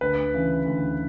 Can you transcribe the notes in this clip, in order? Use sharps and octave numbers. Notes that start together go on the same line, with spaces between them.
D2 B4
C#3 E3
D2